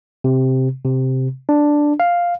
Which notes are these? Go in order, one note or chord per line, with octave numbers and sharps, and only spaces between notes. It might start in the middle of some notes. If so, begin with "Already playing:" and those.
C3
C3
D4
F5